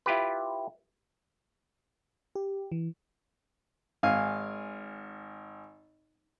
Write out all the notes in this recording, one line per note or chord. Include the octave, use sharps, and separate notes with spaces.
E4 F4 G4 B4
G4
E3
G#1 F5 G#5